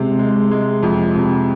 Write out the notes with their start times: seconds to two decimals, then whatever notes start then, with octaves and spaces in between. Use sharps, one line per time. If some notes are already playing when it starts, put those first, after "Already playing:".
Already playing: C3 G#3
0.19 G#3
0.51 G#3
0.83 F2
1.15 C3